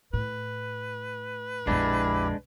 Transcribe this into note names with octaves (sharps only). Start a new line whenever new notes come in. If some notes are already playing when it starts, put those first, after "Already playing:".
A2 B4
A#1 F2 G#3 D4 E4 G4